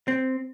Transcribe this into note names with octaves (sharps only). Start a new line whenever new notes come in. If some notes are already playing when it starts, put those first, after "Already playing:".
C4